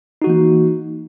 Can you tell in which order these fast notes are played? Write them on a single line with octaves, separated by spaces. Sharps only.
D#4 F#4 E3 A#3